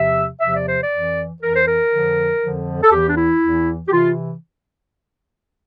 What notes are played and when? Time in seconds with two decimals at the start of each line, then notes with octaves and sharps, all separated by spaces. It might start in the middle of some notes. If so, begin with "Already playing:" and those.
Already playing: E2 C3 F3 E5
0.40 E2 C3 F3 E5
0.54 D5
0.67 C5
0.81 D5
0.91 F2 E3
1.41 F2 E3 A#4
1.54 C5
1.66 A#4
1.91 F2 D3 F3
2.42 F2 D3 F3
2.83 A4
2.92 E2 E3 G4
3.08 D4
3.17 E4
3.42 E2 E3
3.88 G4
3.92 C3 E3 F4